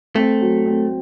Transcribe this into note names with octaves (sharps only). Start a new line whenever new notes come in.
A3 C4
F#3
C4